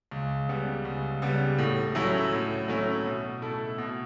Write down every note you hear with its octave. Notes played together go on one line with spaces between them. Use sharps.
C#2
C#3 G3 B3
C#2
C#3 G3 B3
A2
F#3 A3 C#4 E4
A2
F#3 A3 C#4 E4
B2
A3 E4 A4
B2